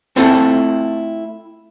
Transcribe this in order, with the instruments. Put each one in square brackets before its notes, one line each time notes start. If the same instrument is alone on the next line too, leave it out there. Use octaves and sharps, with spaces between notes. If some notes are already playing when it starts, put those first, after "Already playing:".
[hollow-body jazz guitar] A3 C4 E4 F4 A4 F#5